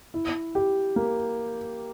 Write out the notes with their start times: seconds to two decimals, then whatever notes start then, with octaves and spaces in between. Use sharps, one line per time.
0.14 E4
0.55 G4
0.96 A#3